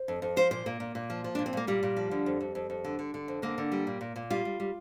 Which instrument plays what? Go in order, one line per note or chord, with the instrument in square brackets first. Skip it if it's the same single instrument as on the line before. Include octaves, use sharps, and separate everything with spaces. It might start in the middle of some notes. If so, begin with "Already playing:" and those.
Already playing: [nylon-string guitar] C5
F2
F2
F3 C5
A#2 C5
A#2 A#3
A#2
A#2
F3
F3
A#2 D4
C4
A#2 A#3
A#2 G3
A#2
F3
D3
F2
F2
F2
F2
D3
D3
D3
F2
D3 A#3
D3
G3
A#2
A#2
A#2
G3 F4
G3
G3